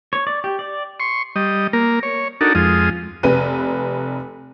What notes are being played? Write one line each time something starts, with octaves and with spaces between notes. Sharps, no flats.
C#5
D5
G4
D5
C6 C#6
G3 D#5
A#3 A#4
C#5
D4 D#4 F#4 A4 A#4
F2 G#3 F4 D#6
F1 B4 D#7